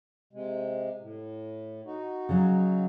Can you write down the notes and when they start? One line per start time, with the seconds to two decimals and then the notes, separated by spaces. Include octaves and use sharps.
0.33 C3 G#3
1.00 A2
1.85 D#4 F#4
2.29 C#3 F#3